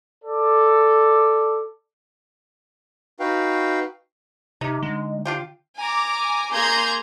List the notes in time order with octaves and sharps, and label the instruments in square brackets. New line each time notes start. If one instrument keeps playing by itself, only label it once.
[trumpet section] A4 D5
[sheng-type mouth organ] D#4 F#4 B4 F5 G5
[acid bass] C3 [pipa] D#4
[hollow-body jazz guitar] D3 [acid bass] G#3
[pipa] D4 F4 G4
[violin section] G#5 A#5 D6
A#3 G#4 A#5 C6 G6 G#6